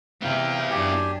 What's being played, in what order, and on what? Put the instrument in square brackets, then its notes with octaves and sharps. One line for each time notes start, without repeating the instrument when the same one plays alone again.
[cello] C3 E3 [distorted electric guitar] B3 E4 [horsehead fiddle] F5 G5
[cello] F#2 D4 [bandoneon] G4 G#5